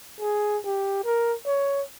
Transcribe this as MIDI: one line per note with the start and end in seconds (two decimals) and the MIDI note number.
0.20 0.59 68
0.65 1.00 67
1.04 1.35 70
1.45 1.83 73